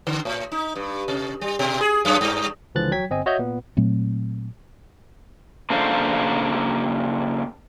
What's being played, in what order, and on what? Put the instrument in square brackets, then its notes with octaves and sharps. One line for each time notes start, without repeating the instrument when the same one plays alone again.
[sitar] D3
A2
D#4
G2
C3
G3
B2
G#4
F#2
G2
[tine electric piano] C#2 D3 E3 F3 F#6 A6
F#3 G5 G#6 B6
G1 C4 D#5 G#5
F#4 C#5 D#5 E5 G6
A#2 B3
[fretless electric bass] A#2 F#3 A3 C4
[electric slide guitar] C#3 A#3 D4 A4 C5 F5